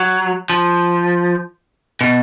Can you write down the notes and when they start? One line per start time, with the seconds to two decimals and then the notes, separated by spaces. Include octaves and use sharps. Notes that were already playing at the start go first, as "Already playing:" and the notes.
Already playing: F#3
0.50 F3
2.01 B2